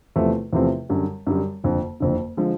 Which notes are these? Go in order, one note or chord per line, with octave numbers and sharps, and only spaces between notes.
E2 C3 F3 A3 C4
E2 C3 F3 A3 C4
F#2 D3 G3
F#2 D3 G3
F#1 F2 D3
F#1 F2 D3
D3 F3 G#3